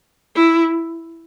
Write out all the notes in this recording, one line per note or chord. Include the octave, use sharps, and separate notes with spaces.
E4